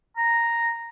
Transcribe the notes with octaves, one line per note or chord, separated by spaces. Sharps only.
A#5